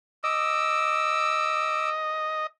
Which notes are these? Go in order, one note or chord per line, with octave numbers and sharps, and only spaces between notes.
D#5 D6 E6